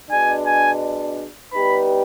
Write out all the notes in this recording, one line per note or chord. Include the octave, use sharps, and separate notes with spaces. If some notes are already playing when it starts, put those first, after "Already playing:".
B2 G#3 D4 G#5
G#5
G3 B3 D#4 G4 B4 B5